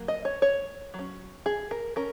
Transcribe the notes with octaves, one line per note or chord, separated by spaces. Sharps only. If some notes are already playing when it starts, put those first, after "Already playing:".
Already playing: F#3 A#3
D#5
C#5
C#5
F#3
C#4
G#4
A#4
C#4 A#4